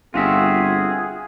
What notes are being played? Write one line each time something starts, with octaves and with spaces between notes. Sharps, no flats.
G1 C4 F4 F#4 G#4 E5